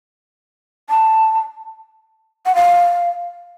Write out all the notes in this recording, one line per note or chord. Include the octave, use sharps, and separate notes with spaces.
A5
F#5
F5